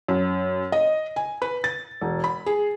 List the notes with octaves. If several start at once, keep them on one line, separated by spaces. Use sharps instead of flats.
F#2
D#5
G#5
B4
A6
E1
B5
G#4